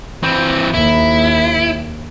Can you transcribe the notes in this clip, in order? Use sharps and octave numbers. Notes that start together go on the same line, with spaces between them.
E3 C4
D#2 E4